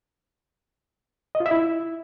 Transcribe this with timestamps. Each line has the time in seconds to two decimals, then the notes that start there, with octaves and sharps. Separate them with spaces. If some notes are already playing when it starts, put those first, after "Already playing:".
1.35 D#5
1.40 F4
1.46 E5
1.51 E4